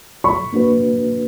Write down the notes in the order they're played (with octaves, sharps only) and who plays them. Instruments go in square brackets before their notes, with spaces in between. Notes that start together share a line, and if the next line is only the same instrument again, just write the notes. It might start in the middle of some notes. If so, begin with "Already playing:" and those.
[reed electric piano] F#3 [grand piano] B5 C#6
[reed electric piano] A#3 D4 F#4 B4